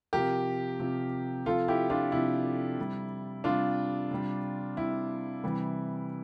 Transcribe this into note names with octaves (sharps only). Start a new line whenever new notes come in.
C3 F3 G4 A#4
C3 F3
C3 F3 F4 A4
E4 G4
D4 F4
C3 F3 E4
C3 G3
C3 G3 D4 F4
C3 G3
C3 G3 E4
C3 E3 G3